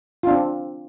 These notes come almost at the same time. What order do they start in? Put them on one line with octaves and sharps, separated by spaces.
F4 D4 C4